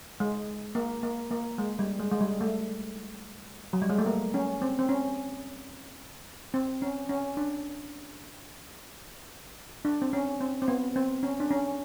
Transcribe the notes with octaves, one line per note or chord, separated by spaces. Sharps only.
G#3
A#3
A#3
A#3
G#3
G3
G#3
G#3
G3
A3
F#3
G3
G#3
A3
A#3
C#4
C4
C4
C#4
C4
C#4
C#4
D4
D4
C4
C#4
C4
C4
B3
C4
C#4
D4
C#4